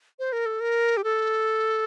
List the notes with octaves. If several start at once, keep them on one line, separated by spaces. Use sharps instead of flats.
C5
A#4
A4
A#4
G4
A4